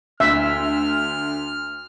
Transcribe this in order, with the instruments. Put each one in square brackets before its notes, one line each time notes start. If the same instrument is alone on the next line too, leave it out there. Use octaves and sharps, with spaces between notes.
[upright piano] D2 [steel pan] E5 [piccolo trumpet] F6